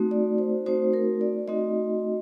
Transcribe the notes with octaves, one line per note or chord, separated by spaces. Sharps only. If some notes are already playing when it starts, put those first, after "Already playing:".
Already playing: A3 C4 D#4 F#4
D5
C5
A3 C4 D#4 F#4 C5
A#4
D5
A3 C4 D#4 F#4 D#5